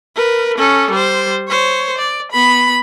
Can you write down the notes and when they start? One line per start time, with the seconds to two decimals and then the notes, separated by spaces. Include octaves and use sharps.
0.15 A#4 B4
0.58 C#4 A4
0.91 G3 C5
1.48 C5 C#5
1.98 D5
2.32 B3 B5